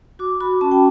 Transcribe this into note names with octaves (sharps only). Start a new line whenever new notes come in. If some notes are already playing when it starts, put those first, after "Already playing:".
F#4 D6
F#4 B5
C#4 A5
G5